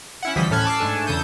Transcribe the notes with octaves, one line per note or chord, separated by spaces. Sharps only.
C#4 E4 F#5
D2 E3 F3 G3 D#5 B6
A2 C#4 A4 F6 F#6 G#6
A5 D6 E6 C7
G#2 A3 D4 A4 G#5 A5
E2 C#3 A4 D#6 G6